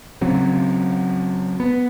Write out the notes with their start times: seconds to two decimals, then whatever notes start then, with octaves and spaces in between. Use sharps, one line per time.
0.21 C#3 F#3 C4
1.60 B3